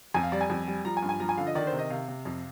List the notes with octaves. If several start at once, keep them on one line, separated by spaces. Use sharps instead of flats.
F2 G#5
F5
G3 D5
G#5
F2
G3
F3 A#5
G#5
G2
G#5
F3 A#5
G#5
D3 F5
D#5
D#3 D5
C5
C3
D#5
C3 F5
C3
F2